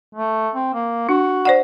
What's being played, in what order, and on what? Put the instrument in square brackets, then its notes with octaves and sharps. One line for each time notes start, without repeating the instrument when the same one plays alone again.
[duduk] A3
C4
A#3
[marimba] D4 [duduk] F#4
[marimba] C5 D5 F#5